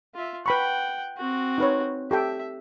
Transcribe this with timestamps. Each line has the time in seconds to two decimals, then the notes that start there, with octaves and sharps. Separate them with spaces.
0.15 F4 E5
0.46 B4 F#5 G5 B5 C#6
1.17 C4 F#4
1.58 D#4 B4 C#5
2.11 G4 A4 E5 G5